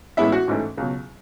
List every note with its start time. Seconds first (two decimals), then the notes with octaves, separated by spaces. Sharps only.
0.17 A1 A2 G#3 B3 E4 E5
0.32 F#4 F#5
0.48 A1 G#2 E3 A3
0.77 C#2 B2 F#3